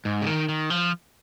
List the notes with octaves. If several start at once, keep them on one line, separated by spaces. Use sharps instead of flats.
G#2
C#3
D#3
D#3
F3